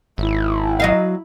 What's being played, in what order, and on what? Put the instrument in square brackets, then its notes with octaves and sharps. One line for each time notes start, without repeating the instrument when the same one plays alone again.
[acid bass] G#1 [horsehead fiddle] E4
[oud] F#3 D#5 F5